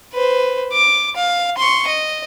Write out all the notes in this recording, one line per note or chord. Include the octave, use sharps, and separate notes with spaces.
B4 C5
D6
F5
C6 C#6
D#5